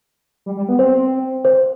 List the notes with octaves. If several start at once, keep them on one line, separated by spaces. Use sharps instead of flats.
G3
G3
B3
C4 C5
C5